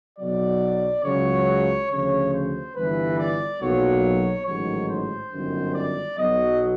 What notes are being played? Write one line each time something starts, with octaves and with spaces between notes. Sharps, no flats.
B1 B2 F#3 D5
C#2 C#3 F#3 C#5
D2 C#3 F3 C#5
C5
G1 G2 E3 B4
D5
B1 A#2 F#3 C#5
A1 G#2 D#3 F#3 C#5
C5
G1 F#2 D#3
D5
B1 B2 F#3 D#5